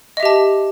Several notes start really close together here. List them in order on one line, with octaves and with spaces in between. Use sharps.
D#5 E5 G4 A5